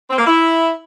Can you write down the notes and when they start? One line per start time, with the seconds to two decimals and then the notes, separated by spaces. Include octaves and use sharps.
0.10 C4
0.18 A#3
0.27 E4